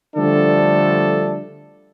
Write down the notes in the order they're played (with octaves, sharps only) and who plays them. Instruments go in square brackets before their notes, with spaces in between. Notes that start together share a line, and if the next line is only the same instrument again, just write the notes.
[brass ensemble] D3 F3 G3 A3 D4 A4